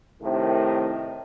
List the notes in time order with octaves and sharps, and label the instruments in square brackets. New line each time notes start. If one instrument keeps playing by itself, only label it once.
[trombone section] A2 C3 D#3